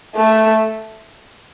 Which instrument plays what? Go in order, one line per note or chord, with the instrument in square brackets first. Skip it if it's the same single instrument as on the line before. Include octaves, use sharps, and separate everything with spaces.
[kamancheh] A3